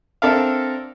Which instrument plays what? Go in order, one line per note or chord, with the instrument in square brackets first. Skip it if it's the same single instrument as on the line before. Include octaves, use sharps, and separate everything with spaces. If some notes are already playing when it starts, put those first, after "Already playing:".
[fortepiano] C4 D4 A4 A#4 E5 F5